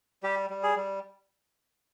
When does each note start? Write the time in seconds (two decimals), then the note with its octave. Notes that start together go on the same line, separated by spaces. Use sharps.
0.23 G3 G4
0.50 G3
0.63 G#4
0.76 G3